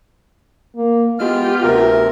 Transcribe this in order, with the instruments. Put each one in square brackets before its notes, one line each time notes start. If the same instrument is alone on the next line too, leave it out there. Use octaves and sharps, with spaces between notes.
[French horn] A#3
[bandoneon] G#3 F6 [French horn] B3 [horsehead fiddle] F4 G4
[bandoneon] D2 C3 A#4